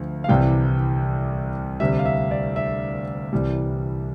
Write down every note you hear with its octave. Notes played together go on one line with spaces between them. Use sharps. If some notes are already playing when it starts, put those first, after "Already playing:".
Already playing: D2 F3
F5
C2 C3 E3 G3 G5
D2 C3 G3 E5
F5
E5
D5
E5
C2 C3 E3 G3